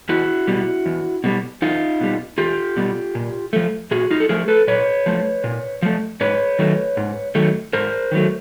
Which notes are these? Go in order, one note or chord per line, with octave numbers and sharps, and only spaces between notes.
E2 E4 F#4
B2 G3
E2
B2 G3
E2 D#4 F4
B2 G3
E2 F4 G4
B2 G3
A#2
F3 A3
A#2 F#4 G#4
D#4 F4
A4
F3 A3 G#4 A#4
A4 B4
A#2 B4 C#5
F3 A3
A#2
F3 A3
G#2 B4 C#5
D#3 F#3 A3
G#2
D#3 F#3 A3
G#2 A#4 C5
D#3 F#3 A3